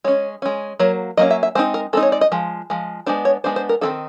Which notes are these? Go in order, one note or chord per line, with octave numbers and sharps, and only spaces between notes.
G#3 C#4 C#5
G#3 C#4
F#3 A#3 C#5
F#3 A#3 C#4 D#5
E5
E5
G#3 C4 D#4 C5
A#4
G#3 C4 D#4 A4
C#5
D5
D#5
F3 G#3
F3 G#3
G#3 B3 D4 C5
C#5
G#3 B3 D4 C5
C5
A#4
D#3 G#3 C4 D#4 A4